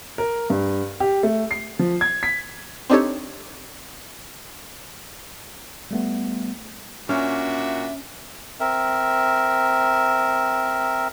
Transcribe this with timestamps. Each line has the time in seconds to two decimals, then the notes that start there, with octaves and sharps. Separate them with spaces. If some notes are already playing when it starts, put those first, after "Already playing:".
0.18 A#4
0.50 G2
1.00 G4
1.23 A3
1.51 C7
1.79 F3
2.01 G#6
2.23 B6
2.90 C4 D4 D#4 G4 A4 C#5
5.91 G3 A3 B3
7.09 A#2 C#4 D4 F#4 E5
8.60 C4 A#4 E5